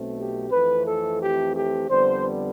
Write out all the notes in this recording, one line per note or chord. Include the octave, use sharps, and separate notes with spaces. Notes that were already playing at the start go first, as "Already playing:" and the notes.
Already playing: B1 B2 A3 C4
G4
F2 E3 A3 C4 B4
A4
G4
G4
F2 D3 G3 B3 C5